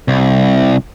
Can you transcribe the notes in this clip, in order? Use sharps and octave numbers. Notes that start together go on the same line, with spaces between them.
C2